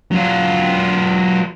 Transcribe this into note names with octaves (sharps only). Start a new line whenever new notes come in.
F#3 F4